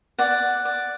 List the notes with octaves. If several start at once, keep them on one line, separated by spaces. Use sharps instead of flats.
D5 F#5
D5